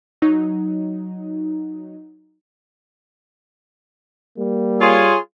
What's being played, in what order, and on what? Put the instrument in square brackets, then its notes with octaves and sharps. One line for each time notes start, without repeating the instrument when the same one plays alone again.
[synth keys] F#3 D#4
[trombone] G3 [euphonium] A#3
[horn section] F4 G#4 [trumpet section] C#5 G#5 C6